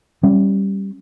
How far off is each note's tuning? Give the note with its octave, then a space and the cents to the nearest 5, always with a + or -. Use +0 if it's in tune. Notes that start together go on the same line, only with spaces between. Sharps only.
G3 +0 C#4 -20